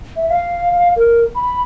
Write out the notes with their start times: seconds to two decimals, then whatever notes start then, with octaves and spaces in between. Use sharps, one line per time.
0.16 E5
0.29 F5
0.75 F5
0.96 A#4
1.35 B5